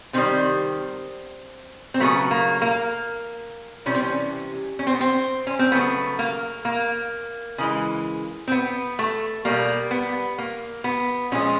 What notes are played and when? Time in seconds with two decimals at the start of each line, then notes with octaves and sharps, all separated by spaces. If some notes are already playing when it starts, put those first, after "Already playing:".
0.13 C3 D#3 G3 C4
1.94 C4
2.00 C#3 F#3 A3 B3
2.31 A#3
2.62 A#3
3.86 C3 E3 G3 C#4
3.95 C4
4.02 C#4
4.79 C#4
4.87 C4
4.94 B3
5.01 C4
5.47 C#4
5.59 C4
5.72 C#3 F#3 A3 B3
6.19 A#3
6.65 A#3
7.58 C#3 E3 G#3
8.48 C4
8.52 B3
8.99 A3
9.45 B2 G3 A#3
9.91 B3
10.38 A#3
10.84 B3
11.32 A#2 F3 G#3 C#4